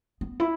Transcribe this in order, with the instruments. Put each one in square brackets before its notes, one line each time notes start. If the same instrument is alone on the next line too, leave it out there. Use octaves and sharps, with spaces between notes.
[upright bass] B3
E4